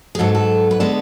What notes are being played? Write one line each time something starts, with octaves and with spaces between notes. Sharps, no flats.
G#4
G#2 F#3 B3 A4
A4
B4
D3 G#3 B3 A4